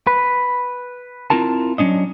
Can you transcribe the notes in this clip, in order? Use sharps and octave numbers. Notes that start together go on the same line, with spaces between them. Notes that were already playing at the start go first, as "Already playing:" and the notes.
B4
C4 E4 F4 A#4 A5
F#3 G#3 C#4 D4 D#5